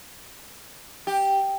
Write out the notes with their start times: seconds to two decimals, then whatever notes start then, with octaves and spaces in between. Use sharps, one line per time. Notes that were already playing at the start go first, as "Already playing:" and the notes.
1.07 G4